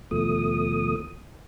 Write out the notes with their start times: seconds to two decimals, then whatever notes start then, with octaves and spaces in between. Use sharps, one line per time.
0.11 D#2 B2 F3 A3 D#6